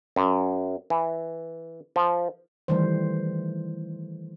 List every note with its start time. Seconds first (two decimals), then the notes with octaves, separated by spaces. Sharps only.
0.16 F#2
0.90 E3
1.96 F3
2.68 D#3 E3 G3 A3 C5